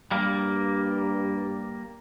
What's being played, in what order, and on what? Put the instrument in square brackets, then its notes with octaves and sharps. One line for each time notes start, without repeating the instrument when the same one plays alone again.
[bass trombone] G2 [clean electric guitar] G3 A#3